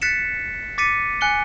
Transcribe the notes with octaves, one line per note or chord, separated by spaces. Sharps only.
F#6 A6 B6 C#7 E7
D6 A6 B6 C#7 D#7
G#5 F#6 C#7 G7